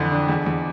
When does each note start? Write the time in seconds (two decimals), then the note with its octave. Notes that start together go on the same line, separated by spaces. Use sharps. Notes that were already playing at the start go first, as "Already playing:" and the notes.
Already playing: F2 D3 E3 D4
0.11 D4
0.29 E2
0.46 E2